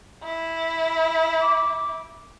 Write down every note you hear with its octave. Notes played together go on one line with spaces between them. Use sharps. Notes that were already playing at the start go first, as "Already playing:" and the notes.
E4
D6